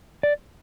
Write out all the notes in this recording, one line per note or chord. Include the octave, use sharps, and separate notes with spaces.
D5